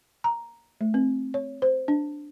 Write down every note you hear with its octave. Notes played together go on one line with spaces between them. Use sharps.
A#5
A3
C4
C#5
C5
D4